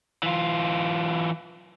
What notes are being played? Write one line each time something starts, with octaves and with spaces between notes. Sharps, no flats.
E3 F4